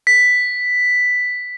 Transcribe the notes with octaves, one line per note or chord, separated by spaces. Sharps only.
B6